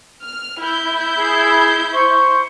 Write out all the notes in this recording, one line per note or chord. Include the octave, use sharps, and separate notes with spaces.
F6
E4 G6
G#4
C5 C#6